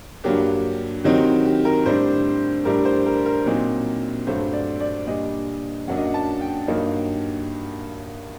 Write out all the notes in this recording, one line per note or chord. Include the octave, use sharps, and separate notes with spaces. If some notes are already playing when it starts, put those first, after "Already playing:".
G2 F#3 A#3 D4 G4
D#3 F#3 C4 D#4 G4
G4
A#4
A2 G3 D4 C5
A2 G3 D4 A#4
C5
A#4
A#4
A#2 F#3 C4 D#4
G2 F#3 A3 C5
D5
D5
A#2 G3 D4 D#5
F#2 F#3 A#3 D4 F#5
D#5
F#5
A5
G5
G2 F#3 A#3 D#4